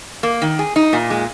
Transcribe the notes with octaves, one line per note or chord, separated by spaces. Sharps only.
A#3
D#3
G#4
D#4
A#2
G#3